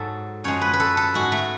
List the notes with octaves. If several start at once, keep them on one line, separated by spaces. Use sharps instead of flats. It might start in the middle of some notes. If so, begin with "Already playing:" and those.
Already playing: G#2 F#3 A4
F#2 F3 G#3 C#5
B4
B4
A4
A4
G#2 G#3 F#4
A3